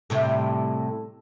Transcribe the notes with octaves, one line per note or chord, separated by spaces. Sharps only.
A2 C3 G3